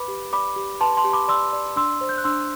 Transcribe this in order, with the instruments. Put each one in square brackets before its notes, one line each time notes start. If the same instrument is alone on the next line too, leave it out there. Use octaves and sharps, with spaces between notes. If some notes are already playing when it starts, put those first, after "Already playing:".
Already playing: [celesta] B4 B5 D6
G4
D5 B5 D6
G4
B4 A5 C6
A5 C6
G4
B5 D6
D5 C6 E6
D5
D4 C6 E6
C5
G6
F#6
D4 C6 E6